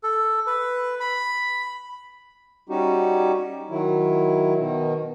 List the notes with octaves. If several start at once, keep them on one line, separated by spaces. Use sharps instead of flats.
A4
B4
B5
G3 C#4 D#4 F#4 G4
D#3 F#3 E4
B2 D#3